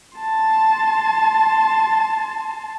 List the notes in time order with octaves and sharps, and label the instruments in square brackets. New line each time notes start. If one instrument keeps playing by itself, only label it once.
[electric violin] A5 C6